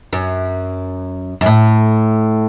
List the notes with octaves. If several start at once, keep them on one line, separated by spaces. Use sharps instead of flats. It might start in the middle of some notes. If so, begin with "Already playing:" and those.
F#2
F#2
A2